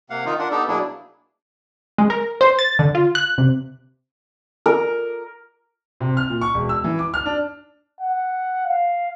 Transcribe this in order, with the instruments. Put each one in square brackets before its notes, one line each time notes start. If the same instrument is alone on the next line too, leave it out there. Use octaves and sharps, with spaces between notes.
[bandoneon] C3 A#3 F5 F#5
D#3 D#4 F4
D4 F4 A#4 F#5
B3 D#4 G4 A4
B2 F#3 A#3 D4 E4 G#4
[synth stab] G#3
A#4
C5
A6
D3
F4
F#6
C3
[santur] A#4
[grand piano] C3
F6
A#2
C#6
E1
E6
E3
D6
F6
D4
[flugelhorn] F#5
F5